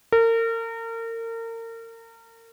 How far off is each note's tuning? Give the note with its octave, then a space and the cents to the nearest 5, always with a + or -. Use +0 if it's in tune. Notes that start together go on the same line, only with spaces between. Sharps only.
A#4 -35